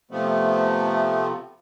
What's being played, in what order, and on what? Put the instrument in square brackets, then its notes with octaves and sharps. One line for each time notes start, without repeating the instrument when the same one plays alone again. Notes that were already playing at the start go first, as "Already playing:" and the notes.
[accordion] C3 F3 A3 B3